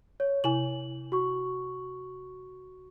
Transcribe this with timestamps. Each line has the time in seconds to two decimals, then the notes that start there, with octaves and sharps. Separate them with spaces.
0.20 C#5
0.44 C3 E4 G#5 F#7
1.12 F#4 C#6